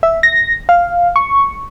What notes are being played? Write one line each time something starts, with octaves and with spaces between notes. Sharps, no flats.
E5
A#6
F5
C#6